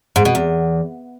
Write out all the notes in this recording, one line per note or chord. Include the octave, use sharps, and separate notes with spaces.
G#2
B2
E2